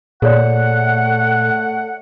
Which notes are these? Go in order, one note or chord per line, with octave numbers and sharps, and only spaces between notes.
A#2 A3 G#4 C#5 D5 F#5